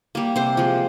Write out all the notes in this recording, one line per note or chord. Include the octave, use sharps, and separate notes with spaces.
G3 A#3
C3 C5
F3 G#3